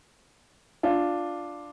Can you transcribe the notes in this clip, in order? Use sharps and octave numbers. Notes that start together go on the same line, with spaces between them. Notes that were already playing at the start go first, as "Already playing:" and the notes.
D4 F4